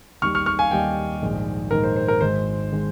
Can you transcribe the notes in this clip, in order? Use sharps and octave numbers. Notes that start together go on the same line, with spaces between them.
D#2 D#3 G3 C#6 F6
C#6 F6
C#6 F6
F5 G#5
D#2 D#3 G3 D#5 G5
A#1 G#2 D#3
A#1 G#2 D#3 A#4
C5
C5
A#4
G#1 G#2 D#3 G#3 C5
D#3 G#3